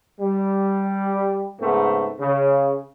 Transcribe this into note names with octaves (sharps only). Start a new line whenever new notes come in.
G3
G#2 C#3 A3 B3 C4
C#3